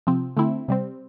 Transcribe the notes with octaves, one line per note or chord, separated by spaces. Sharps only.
C3 F3 C4
D3 A3 C4 E4
C3 G3 C4